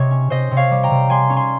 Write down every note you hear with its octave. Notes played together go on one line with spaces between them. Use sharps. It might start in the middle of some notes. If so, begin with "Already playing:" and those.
Already playing: C3 C#5 D#5
C#4
C3 C5 D#5
C3
C#5 F5
G3
G5 A#5
C3
G3 G#5 C6
C#4
G#5 C6